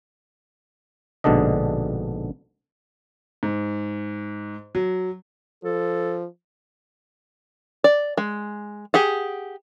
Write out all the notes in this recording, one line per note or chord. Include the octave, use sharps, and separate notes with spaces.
A#1 G#2 B2 D3 D4 D#5
G#2
F#3
F3 A4
D5
G#3
G4 G#4 F#5